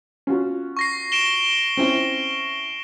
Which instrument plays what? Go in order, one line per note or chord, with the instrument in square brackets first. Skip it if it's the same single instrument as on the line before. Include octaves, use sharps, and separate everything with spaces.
[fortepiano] C#4 F4 F#4
[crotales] C#6 A#6 C7
D7 E7 G7
[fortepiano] C4 C#4 E4